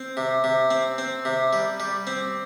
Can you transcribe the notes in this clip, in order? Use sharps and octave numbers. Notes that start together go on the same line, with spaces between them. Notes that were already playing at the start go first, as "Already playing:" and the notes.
Already playing: C4
C3
C3
C4
C4
C3
G3
G3
C4